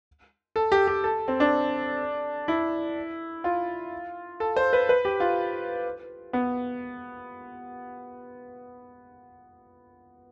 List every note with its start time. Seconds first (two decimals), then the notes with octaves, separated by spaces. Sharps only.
0.56 A4
0.72 G4
0.87 G4
1.04 A4
1.28 C4
1.40 D4
2.48 E4
3.44 F4
4.40 A4
4.56 C5
4.73 B4
4.89 B4
5.05 G4
5.20 F4
6.33 B3